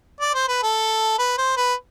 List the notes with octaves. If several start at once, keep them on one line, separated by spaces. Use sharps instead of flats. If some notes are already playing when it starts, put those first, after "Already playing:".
D5
C5
B4
A4
B4
C5
B4